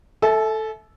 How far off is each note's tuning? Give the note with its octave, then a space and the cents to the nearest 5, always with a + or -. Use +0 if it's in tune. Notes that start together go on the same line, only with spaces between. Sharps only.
A4 +0 E5 -15 A5 -45